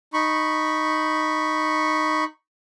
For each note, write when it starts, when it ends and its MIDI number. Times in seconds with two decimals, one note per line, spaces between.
0.13 2.24 63
0.13 2.24 83
0.13 2.24 85